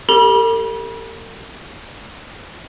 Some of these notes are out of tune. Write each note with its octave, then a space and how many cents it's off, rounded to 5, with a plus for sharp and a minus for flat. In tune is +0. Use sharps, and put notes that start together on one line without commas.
G4 +20 A#4 -45 B5 -40